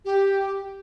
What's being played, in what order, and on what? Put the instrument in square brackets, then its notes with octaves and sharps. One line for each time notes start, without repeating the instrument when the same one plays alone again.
[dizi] G4